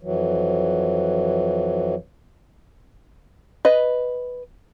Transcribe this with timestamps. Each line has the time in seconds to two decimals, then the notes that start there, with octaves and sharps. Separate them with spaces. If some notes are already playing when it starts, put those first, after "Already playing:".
0.03 F2 E3 F#3
3.65 B4 D#5